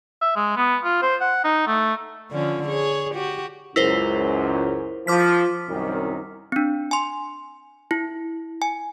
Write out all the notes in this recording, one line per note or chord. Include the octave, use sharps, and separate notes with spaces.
E5
G#3
B3
F4
C5
F#5
D#4
A3
D3 F3 C#4
G#4 C#5
F#4 G4
C#2 F#2 E4 A#4 C5
F3 D6 F6 B6
C2 F#2 D#3
C4 D4
G#5 C6
E4
G#5